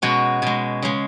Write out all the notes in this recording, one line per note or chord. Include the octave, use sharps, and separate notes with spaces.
B2 G#3 C#4 F#4
B2 G#3
C#3 G#3